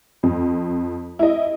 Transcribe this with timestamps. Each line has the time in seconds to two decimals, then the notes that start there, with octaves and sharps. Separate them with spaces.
0.23 F2
1.19 E4 D#5